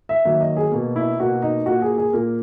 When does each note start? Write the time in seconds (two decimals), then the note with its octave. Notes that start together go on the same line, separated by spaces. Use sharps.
0.09 E5
0.25 D#3 F#3 A#3 E5
0.41 D#5
0.57 G#4
0.72 B2 A#3
0.96 E4
1.20 B2 A#3 F#4
1.42 D#4
1.66 A#2 A#3 F#4
1.82 G#4
1.98 G#4
2.13 A#2 A#3 A#4